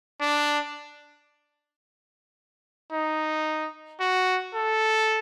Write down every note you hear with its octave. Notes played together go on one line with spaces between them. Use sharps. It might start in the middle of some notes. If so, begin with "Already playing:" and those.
D4
D#4
F#4
A4